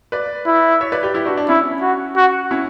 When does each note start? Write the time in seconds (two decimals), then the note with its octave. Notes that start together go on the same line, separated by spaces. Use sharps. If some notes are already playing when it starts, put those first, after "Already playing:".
0.12 B4 D5
0.47 E4
0.81 C#5 E5
0.92 B4 D5
1.03 G4 B4
1.14 E4 G4
1.25 D4 F#4
1.37 D4
1.49 C#4 E4
1.82 F#4
2.16 F#4
2.51 C#4 E4